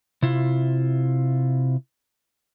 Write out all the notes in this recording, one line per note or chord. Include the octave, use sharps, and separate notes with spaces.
C3 E4 F4